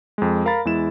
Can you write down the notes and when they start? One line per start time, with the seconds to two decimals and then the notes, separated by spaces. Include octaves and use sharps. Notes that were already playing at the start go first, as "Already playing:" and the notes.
0.18 F2 G#3
0.45 A#4 F5 A#5 B5 A6
0.65 E2 G#3 E4 E7